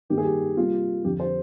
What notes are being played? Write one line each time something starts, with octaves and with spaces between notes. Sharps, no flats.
G2 D#3 G3 A#3 G4
G#4
G4
C3 G3 A#3 F4
F2 D3 F3 G4
C5